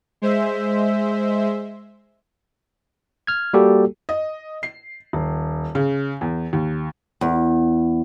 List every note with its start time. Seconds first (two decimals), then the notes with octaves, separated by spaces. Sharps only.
0.22 G#3 C5 E5
3.27 F6 G#6
3.54 G3 A#3 F#4 G4 A4
4.09 D#5
4.63 C7
5.13 D#1
5.75 C#3
6.21 E2
6.53 D#2
7.21 E2